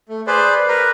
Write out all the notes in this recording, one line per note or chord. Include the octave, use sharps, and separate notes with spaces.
A3
G#4 B4 C5 D5
A#4 B4